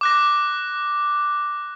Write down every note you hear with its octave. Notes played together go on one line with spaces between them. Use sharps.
D6 F#6 A#6